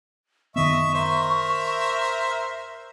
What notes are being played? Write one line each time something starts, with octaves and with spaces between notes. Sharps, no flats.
F#2 D#3 B3 D#5 E5 C#6
A#4 C5 E5